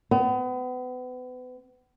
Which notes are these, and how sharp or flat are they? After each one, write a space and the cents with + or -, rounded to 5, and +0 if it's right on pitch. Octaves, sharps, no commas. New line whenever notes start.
B3 +35